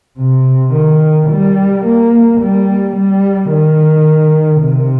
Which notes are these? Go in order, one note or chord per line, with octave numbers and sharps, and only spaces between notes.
C3
D#3
G3
A#3
G3
G3
D#3
C3